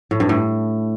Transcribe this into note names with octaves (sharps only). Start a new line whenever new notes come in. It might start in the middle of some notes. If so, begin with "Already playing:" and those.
A2
G2
A2